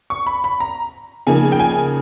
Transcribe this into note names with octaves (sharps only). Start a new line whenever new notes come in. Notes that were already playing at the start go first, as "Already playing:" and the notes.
C#6
B5
B5
A#5
C#3 F3 A#3 D#4 G#5
G5
G#5